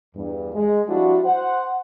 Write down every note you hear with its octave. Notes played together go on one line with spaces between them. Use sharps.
E2 G2
G#3
F3 G3 D4 E4 F#4
C5 F#5